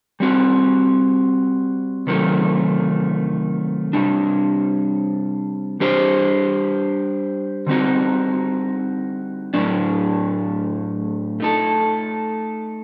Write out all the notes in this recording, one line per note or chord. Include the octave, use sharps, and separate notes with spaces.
G3 C4 F#4
C3 D#3 F#3 A3
C3 G3 D4
G3 D4 G4 C5
D3 G3 C4 D#4 F#4
A2 F#3 A3 D4
A3 D#4 A4